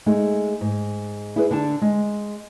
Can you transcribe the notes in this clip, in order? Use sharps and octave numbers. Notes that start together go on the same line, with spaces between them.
G#3 A3 D#4
G#2
E4 G#4 B4
D3 D4 A5
G#3